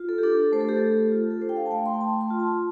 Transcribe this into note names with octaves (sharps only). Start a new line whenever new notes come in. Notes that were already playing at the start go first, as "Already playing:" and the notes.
Already playing: F4
A4
G4
D4 A4
A3 C5
A4
G4
A3 A4
F4
A4
D4 C5
G5
F5
A5
A3 G5
C6
G5
A3 A5
C6
F4
A5